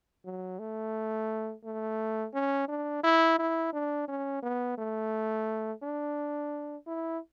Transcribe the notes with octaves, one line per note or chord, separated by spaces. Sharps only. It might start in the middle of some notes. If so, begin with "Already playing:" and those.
F#3
A3
A3
C#4
D4
E4
E4
D4
C#4
B3
A3
D4
E4